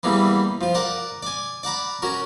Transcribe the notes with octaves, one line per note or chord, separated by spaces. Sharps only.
E2 E3 G3 A#3 B3
F3 F4
A#4 D5 F#5
D5 G#5
D5 F#5 A#5 B5
C#4 F#4 A#4